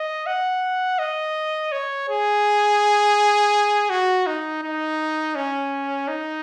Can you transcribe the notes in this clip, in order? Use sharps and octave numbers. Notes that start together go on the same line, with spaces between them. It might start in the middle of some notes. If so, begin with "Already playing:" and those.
Already playing: D#5
F#5
D#5
C#5
G#4
F#4
D#4
D#4
C#4
D#4